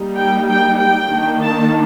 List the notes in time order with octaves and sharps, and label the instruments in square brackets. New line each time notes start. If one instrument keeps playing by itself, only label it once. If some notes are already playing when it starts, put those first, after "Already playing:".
Already playing: [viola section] G3 A#3 D#4
G5
G5
G5
D#3 A#3 D4
A5